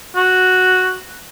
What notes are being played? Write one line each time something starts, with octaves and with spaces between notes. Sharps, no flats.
F#4